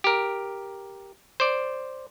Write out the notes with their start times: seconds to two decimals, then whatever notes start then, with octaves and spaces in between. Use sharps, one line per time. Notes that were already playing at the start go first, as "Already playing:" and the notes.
0.04 G4 A#4
1.40 C5 D5